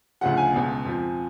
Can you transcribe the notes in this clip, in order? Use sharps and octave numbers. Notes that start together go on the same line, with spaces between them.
D2 C#3 F3 F#5
G#5
C#2 B2
F2 F3